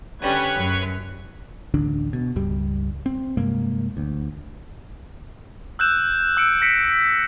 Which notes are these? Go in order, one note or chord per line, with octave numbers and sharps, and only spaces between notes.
D3 G3 C#4 B4 C#5 G#6
F#2
A1 D2 D3 D4
B2
C#2 G2 G3
C4
G2 C3 G#3 A#3
D2
E6 F#6 G6 E7
E6 C#7 D7
F#6 A#6 B6 C#7 D7